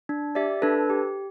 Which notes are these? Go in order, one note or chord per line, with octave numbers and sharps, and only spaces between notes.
D4
G4 D5 E5
D4 A4 B4
G4